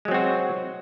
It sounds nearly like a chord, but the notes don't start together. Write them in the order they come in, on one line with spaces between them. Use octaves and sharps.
G#3 F#3 C4 F#4